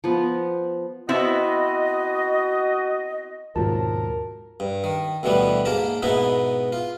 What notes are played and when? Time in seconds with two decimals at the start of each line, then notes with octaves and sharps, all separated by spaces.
0.04 F3 B3
1.09 B3 C4 E4 F#4 D#5
3.56 D#2 G#2 B2 F3 F#3 C4 A#4 A5
4.60 G2
4.84 D#3
5.23 D2 B2 E3 G3 B3
5.65 G#2 A#3 A#4 A5 A#5
6.02 G#2 B2 B3 D#4 E4
6.73 F4